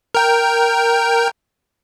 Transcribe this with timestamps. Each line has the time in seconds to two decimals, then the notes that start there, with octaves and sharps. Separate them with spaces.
0.15 A#4 G5